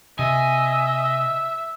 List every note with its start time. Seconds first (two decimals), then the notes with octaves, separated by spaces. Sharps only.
0.19 C3 D#5 E5 G#5